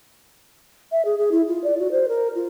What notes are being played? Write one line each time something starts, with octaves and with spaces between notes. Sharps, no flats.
E5
G#4
G#4
E4
F4
D5
F#4
C5
A#4
F4